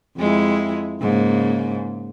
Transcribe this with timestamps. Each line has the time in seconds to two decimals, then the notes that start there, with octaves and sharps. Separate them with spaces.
0.17 F2 G#3 E4
1.01 G#2 C#3 A#3